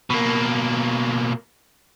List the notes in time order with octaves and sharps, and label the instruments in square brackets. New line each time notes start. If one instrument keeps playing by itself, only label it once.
[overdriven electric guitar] B2 A#3